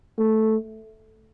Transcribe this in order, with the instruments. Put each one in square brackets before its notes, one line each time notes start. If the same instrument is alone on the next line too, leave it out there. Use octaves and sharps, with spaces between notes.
[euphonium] A3